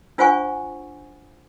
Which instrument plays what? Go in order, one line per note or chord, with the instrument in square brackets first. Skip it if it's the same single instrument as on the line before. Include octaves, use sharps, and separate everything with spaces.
[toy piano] D4 F4 C5 F#5 G#5 C#6